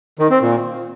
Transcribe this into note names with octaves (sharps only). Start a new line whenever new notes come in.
D#3
C4
A#2